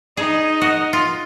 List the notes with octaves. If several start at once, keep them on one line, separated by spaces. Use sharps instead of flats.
D#4 G#4 D#5
F#4
F4